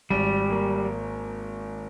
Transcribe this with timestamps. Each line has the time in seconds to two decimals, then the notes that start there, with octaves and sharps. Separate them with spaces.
0.10 G#1 G3
0.50 A#3